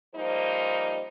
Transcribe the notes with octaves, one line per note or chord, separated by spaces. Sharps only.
F3 G3 A#3 D#4 C5